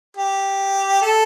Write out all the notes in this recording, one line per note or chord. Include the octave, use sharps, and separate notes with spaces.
G4
A4